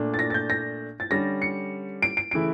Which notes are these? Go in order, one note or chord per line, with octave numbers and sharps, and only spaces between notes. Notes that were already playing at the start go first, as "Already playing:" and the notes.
Already playing: A#2 A3 D4
A6
A#6
A6
G6
A#6
A6
D3 G3 C#4 G4 A#6
C#7
D7
D7
C#3 E3 A3 E4 D7